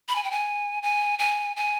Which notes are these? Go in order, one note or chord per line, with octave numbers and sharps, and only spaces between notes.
B5
G#5
G5
G#5
G#5
G#5
G#5